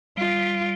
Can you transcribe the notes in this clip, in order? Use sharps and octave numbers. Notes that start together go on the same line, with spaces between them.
G3 F4